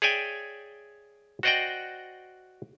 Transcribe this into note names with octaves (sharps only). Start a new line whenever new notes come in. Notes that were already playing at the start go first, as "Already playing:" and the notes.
G#4 C#5 D5 E5 G5 G#5
F#4 C5 D5 D#5 F#5 G5